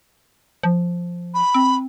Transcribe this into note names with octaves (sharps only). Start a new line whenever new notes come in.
F3
B5
C4